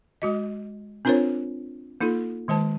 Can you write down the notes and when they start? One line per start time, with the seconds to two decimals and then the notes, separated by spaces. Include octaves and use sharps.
0.22 G#3 F#4 D#5
1.05 C4 D4 F4 A#4 C5 C#5
2.01 A#3 D#4 F4 A4
2.48 D#3 G#3 C5 A5